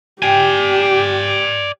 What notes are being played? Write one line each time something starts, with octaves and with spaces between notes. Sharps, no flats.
G4 D5 G5 G#5